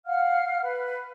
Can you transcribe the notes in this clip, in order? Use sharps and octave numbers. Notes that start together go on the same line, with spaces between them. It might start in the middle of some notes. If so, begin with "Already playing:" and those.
F5 F#5 F6
B4